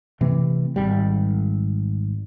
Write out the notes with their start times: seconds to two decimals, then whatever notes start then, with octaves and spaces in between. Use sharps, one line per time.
0.21 C3 E3 A3 C4
0.76 G#1 G3